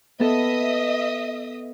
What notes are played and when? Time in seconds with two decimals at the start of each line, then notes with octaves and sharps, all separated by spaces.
0.20 B3 A4 D#5 E5 D#6